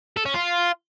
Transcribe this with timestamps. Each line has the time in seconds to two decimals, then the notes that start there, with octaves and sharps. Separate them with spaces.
0.17 A4
0.26 C#4
0.34 F4